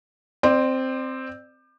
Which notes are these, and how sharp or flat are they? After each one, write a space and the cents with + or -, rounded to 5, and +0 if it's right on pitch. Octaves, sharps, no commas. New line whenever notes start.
C4 +0 D5 +30